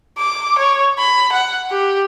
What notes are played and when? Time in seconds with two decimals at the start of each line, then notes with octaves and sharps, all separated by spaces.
0.18 D6
0.59 C#5
0.99 B5
1.32 F#5
1.71 G4